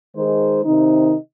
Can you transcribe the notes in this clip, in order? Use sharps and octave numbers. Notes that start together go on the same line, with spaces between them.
D#3 G#3 D#4 G#4 C5
C3 D#3 C4 D#4